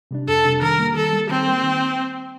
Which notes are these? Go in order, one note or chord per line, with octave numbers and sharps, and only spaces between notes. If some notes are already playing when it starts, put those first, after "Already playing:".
C3 G3 D4
F2 A4
C3 G3 D4
D#3 A#4
G3 A#3
D#3 A4
G3 A#3
D#3 C4
G3 A#3
D#3